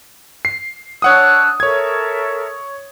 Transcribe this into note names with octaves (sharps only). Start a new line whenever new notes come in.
C7
D4 C#5 F#5 D#6 E6 F#6
A4 A#4 C#5 E5 G#6